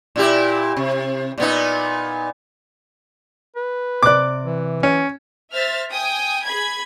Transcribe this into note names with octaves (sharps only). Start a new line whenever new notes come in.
A#2 E4 G4
C3
A#2 B3 D#4
B4
C3 D5 D6 F#6
E3
C#4
C5 E5 F6 A6
G5 G#5 D#6
G#4 B5 G#6